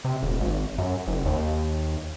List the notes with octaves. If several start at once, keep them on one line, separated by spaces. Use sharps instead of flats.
C3
D#1
G#1
F#2
F#1
D#2